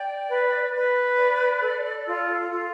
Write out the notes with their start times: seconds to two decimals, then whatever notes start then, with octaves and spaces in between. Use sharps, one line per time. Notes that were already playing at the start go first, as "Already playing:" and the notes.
Already playing: D5 G5
0.29 B4
0.73 B4
1.17 D5
1.61 A4
2.06 F4
2.50 F4